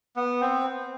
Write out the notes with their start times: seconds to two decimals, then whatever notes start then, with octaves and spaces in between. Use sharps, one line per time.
0.16 B3
0.41 C4